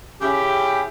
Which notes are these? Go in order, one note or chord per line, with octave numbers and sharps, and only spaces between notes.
C#3 C#4 E4 G4